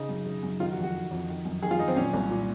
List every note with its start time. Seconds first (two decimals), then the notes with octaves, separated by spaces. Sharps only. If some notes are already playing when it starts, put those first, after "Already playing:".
Already playing: C#3 D#4
0.09 F#2
0.26 C#3
0.43 F#2
0.60 D#3 F4
0.72 F#4
0.78 F2
0.83 F#4
0.94 D#3
1.11 F2
1.28 D#3
1.45 F#2
1.62 D#3 G#4
1.71 F4
1.79 F#2 D#4
1.88 C4
1.96 A#2 C#4
2.14 C2
2.31 A#2